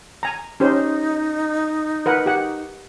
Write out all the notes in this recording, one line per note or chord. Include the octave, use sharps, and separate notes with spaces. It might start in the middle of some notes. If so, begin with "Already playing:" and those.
G#5 A#5
C#4 D#4 G4 C5
A#4 B4 F#5
G4 F#5